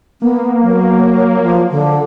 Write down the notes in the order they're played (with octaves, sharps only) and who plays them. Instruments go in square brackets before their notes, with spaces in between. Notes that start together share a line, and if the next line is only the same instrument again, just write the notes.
[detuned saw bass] A#3 [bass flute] B3
[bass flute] F#3
F3
D3